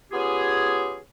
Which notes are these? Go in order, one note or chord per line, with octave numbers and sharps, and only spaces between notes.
B3 C#4 F4 G4 G#4